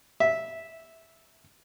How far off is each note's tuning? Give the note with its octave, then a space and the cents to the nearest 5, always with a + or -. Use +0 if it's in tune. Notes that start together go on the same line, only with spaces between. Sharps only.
E5 -10